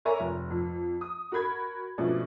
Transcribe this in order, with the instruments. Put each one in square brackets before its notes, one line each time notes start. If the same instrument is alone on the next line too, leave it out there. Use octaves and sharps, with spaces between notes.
[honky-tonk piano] A#4 C#5 D5 E5 G#5 A#5
F1
F2
D#6
F#4 A#4 B5 G#6
B2 F3 A3 C#4 D4